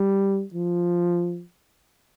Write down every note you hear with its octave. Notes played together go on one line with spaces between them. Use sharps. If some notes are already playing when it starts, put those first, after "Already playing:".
Already playing: G3
F3